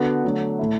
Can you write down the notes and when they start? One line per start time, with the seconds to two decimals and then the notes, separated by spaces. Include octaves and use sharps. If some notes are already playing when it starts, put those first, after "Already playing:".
Already playing: D3 B3 D4 F#4
0.24 D3 F#3 A3 D4
0.59 A2 A3 E4